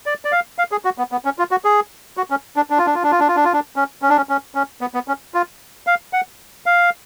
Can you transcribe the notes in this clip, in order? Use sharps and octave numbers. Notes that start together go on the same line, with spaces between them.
D5
D5
F5
F5
G#4
F#4
B3
B3
C#4
F4
F#4
G#4
F#4
C#4
D4
D4
F4
D4
F4
D4
F4
D4
F4
D4
F4
D4
C#4
C#4
D4
C#4
C#4
C#4
B3
B3
C#4
F4
F5
F#5
F5